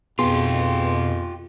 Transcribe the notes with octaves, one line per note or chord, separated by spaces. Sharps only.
F2 B2 B3 F4 G4 G#4 C6